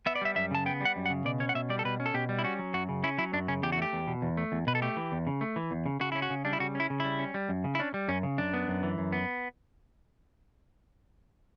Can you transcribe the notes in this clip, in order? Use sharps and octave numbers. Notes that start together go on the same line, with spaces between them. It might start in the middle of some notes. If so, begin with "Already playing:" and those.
B3 E5
D5
G3 E5
F#2 E5
C#3 A5
B3 G5
G3 F#5
F#2
F#5
C#3
B2 D5
C#4 C#5
F#5
B2 E5
G3 D5
A4
B2 B4
C#4
A4
B2 G4
G3
E4
C#4 F#4
F#3
F#2 F#4
C#3
C#4 E4
F#3 E4
F#2 D4
C#3 C#4
E2 G4
F#4
A3 G4
E2
B2
E2
A3
E2
B2 B4
A4
A3 G4
E3
E2
C#3
A3
E3
E2
C#3
C#3 F#4
C#4 E4
F#4
C#3
G3 D4
E4
C#3 F#4
C#4 E4
C#3
G3 E4
C#4
G3
F#2
C#3
E4
C#4 D4
G3
F#2 C#4
C#3
F#2 D4
B3
F#2
E3
F#2
B3